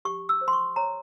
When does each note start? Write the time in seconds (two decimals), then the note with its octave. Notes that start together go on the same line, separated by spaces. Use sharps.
0.05 G4 C#6
0.29 E6
0.41 C5
0.48 C6
0.53 C#6
0.76 C#5 A#5